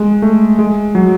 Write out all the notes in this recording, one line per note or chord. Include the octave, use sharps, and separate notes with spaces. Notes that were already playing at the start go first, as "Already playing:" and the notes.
Already playing: G#3
A3
G#3
F#3